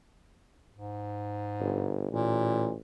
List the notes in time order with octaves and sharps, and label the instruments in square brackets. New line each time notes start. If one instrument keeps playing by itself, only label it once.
[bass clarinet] G#2
[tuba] G1
[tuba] A1 [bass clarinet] A#2